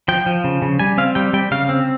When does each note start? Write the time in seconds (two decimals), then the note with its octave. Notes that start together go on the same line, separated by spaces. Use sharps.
0.08 F3 G5
0.26 F3
0.44 C#3
0.62 C#3
0.79 G3 G#5
0.98 C4 F5
1.15 G3 G5
1.33 G3 G5
1.51 C#3 F5
1.69 C4